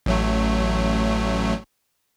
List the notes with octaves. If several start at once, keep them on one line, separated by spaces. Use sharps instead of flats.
A1 F#3 A3